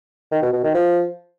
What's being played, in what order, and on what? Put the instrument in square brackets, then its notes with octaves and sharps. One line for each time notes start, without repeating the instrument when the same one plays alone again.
[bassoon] D#3
B2
B2
D#3
F3